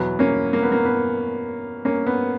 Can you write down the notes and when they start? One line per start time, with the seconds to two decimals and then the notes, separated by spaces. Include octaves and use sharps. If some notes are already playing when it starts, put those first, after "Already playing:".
Already playing: E2 B2 F#3 B3
0.19 A#3 C#4
0.53 A#3
0.63 B3
0.72 A#3
0.85 B3
1.85 A#3 C#4
2.07 B3